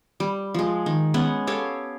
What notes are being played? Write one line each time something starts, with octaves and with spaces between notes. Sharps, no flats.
G3
F3 G#3
D#3
G#3 B3 C#4 F#5
G4 A4 C#5 F5